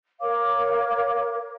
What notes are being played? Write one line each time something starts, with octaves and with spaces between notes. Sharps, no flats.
A#4 C#5 F5 D6